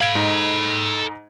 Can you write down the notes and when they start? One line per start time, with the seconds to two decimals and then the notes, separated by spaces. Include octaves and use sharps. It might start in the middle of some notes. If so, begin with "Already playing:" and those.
0.01 A4 F5 B5 G#6 D7
0.15 G#2 D#4